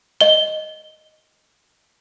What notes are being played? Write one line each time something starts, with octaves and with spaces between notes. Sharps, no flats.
D#5 G7